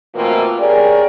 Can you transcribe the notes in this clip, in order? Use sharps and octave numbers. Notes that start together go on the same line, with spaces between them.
B2 E3 A3 A#3 C4 F4
C#4 G4 G#4 A#4 D5